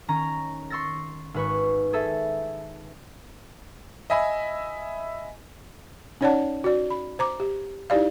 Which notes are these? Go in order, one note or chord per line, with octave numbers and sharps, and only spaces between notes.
D#3 C#4 A#5
C6 C#6 E6 A6 A#6
G#1 B4 C#6
G#4 A4 E5 A5
D#5 E5 G#5 B5
C#4 D#4 C#5 D5 F#5 A5
F#4 D5
B5
C5 A#5 D6
G4
D#4 E4 G4 D5 F5